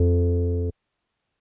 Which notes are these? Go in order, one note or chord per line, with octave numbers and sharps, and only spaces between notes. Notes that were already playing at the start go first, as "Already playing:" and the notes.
Already playing: F2